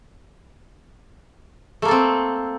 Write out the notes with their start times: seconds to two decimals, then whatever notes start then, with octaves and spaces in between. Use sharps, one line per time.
1.82 A3
1.85 A#3
1.88 A4
1.91 C4